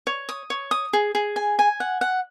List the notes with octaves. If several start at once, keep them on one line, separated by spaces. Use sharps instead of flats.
C#5
D#6
C#5
D#6
G#4
G#4
G#5
G#5
F#5
F#5